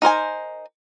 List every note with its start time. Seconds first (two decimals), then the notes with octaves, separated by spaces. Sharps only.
0.02 D#4 A#4 C5 G#5